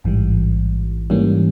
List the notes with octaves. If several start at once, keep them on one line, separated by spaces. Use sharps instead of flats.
A1 G#2 E3 G3
G#2 E3 G3 A#3 C#4